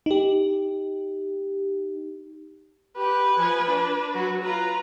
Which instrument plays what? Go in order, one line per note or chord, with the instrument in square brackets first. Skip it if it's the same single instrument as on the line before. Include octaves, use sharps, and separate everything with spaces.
[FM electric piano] D#4 G4
[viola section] G4 [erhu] B4
[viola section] F3 G#5
D4
F#3 F#4
[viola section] F4 B4 [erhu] A#5